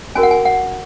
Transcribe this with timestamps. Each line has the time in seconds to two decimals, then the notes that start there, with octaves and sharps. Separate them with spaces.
0.15 C#4 F#4 A#4 G#5
0.23 F#5
0.31 G#5
0.45 F#5